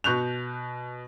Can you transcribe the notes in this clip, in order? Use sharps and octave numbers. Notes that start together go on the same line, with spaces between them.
B2 C#6 F#6 G6 F7